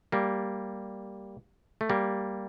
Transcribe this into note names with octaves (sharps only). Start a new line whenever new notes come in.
G3 A#3
A3
G3 A#3